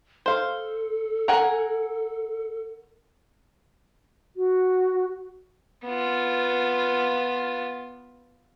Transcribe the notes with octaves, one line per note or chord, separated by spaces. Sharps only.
A4 C5 F5
A#4 F#5 G#5
F#4
B3 F4